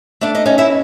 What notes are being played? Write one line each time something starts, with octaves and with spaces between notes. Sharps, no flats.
A3 D4 D5
D#4 D#5
C#4 D#4 D#5
E4 E5